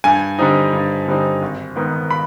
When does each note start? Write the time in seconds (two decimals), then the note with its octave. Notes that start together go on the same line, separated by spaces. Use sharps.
0.04 G2 G#5
0.39 D3 G3 C4 D#4
0.73 G2
1.08 D3 G3 C4 D#4
1.42 G#1
1.76 G#2 D#3 B3
2.11 B5